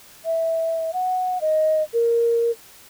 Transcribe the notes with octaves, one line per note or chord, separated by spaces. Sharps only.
E5
F#5
D#5
A#4